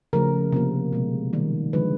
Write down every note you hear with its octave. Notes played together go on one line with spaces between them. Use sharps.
C#3 F3 A3 A#4
C3 F3 A#3
B2 G#3
D#3 G3 A#3
D3 F3 G#3 B4